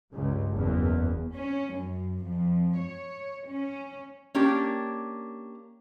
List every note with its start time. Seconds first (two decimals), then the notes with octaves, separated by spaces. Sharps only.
0.14 C#2 G2
0.53 F#1 E2
1.34 C#4
1.73 F#2
2.21 F2
2.78 C#5
3.48 C#4
4.35 A#3 C#4 D4 G4